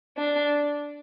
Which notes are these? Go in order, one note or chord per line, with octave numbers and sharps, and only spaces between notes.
D4